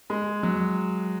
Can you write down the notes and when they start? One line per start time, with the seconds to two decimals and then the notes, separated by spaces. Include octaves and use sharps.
0.10 G#3
0.43 F#3